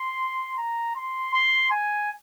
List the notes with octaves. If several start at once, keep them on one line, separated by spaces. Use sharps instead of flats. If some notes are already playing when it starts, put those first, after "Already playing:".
Already playing: C6
A#5
C6
C6
G#5